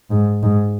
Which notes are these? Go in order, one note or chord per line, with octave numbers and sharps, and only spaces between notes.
G#2
G#2